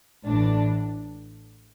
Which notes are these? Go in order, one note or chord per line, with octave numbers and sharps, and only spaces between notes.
A1 A2 E3 D4